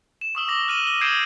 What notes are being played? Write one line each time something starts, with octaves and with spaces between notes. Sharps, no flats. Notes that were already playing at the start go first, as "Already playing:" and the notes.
E7
C#6 D#6 E6 F#7
D6 A#6 F#7
F6 D#7 F#7
G7
D#6 G6 G#6 C7 D7 E7